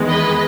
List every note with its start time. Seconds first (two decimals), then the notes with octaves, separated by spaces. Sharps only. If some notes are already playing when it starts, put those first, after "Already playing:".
Already playing: E2 D#3 G#3 B3
0.08 B4 D#5